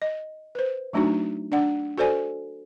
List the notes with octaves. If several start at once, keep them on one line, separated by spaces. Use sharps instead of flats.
D#5
B4 C5
F#3 A3 D4 D#4 F#4
D4 D5 F#5
F#4 A4 C5 D5 G#5